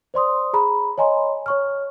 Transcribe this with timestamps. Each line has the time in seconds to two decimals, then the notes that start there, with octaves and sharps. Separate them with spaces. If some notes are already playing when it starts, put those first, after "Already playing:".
0.14 C5 D5 C6 D#6
0.53 G#4 A#5 B5
0.98 C#5 D#5 G#5 A#5 C6
1.46 C#5 C#6 F6